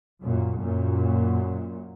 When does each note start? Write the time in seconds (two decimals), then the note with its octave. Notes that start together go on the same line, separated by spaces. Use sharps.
0.22 F#2 A#2
0.58 F#2 A#2